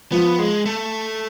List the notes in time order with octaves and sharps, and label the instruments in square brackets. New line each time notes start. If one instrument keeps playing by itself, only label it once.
[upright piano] F3 [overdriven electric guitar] B3
[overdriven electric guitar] G#3
A3